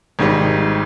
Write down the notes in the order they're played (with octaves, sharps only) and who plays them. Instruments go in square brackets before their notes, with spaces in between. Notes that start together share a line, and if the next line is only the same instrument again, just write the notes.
[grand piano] G#1 G#2 D#3 G3